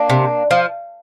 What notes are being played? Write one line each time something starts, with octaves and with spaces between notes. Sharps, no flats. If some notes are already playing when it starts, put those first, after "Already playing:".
Already playing: A#3 D4
C3
F3